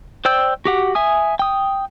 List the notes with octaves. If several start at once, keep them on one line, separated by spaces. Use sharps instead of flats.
C5 D5 G5 E6 G6
F#4 G4 F#5
E5 G#5 D#6
G5 D#6